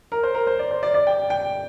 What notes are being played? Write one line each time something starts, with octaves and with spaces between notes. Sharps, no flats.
A#4
C5
A#4
C5
D5
C5
D5
D5
G5
G5